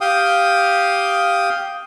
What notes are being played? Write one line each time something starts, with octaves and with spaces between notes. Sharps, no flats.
G4 F5 G5 D#6